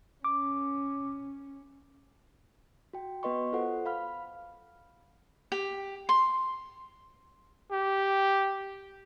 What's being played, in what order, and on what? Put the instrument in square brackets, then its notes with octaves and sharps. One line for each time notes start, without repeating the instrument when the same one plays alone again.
[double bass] C#4 [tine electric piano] D6
[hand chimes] F#4 G5
B3 F#4 B4 D#5 C6 C#6
F4 A4 C5 F#5
F5 B5 F6
[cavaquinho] G4
C6
[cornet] G4